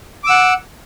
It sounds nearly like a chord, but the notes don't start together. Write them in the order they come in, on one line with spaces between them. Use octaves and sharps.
D6 E6 F#5